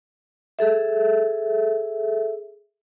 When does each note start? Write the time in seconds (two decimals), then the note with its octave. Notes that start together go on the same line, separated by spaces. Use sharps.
0.59 G#4 A4 E5